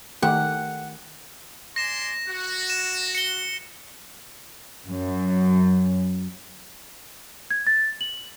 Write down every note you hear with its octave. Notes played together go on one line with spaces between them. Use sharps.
D#3 A3 G4 F#5
D5 G#5 C6 A#6 E7
F#4
E7
C#7 G7
F#2
G#6
A6
F#7